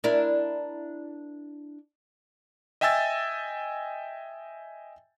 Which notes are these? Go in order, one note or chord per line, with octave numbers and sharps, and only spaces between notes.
D4 E4 A#4
D#5 E5 G5 G#5 E6 A6